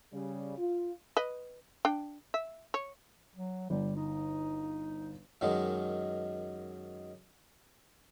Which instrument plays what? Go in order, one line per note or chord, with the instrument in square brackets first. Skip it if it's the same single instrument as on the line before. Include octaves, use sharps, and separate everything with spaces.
[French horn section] C#3 G3
F4
[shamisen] B4 D#5
D4 G5
E5
C#5
[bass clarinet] F#3
[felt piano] G1 [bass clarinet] G3
[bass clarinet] D#4
[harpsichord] F#2 D#3 F#3 G#3